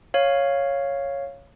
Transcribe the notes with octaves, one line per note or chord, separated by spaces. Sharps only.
C#5 F5